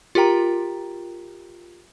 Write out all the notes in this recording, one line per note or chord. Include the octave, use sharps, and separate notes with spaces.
F4 G4 A#4 G5 A#5